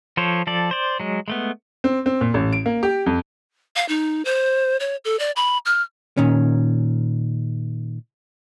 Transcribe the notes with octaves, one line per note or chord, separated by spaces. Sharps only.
F3 A4 C5 C#5
F3 A4 D5
C5 D5
F#3 G#3
G#3 A3 B3
C4
C4
A#2
A1
D7
A#3
G4
F2
F5
D#4
C5
C#5
A4
D5
B5
F6
A#2 D#3 C#4